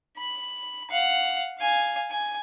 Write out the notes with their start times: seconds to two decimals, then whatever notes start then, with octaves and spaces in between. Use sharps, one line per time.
0.17 B5
0.91 F5 F#5
1.59 F5 G#5
2.11 G#5